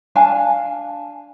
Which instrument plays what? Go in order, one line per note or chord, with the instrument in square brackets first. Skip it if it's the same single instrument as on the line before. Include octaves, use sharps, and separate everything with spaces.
[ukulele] D4 F5 G#5 A5